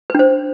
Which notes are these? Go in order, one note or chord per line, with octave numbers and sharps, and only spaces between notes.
D4 B4 C5